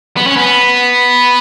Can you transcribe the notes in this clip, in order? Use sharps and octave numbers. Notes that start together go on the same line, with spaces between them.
B3
C#4
B3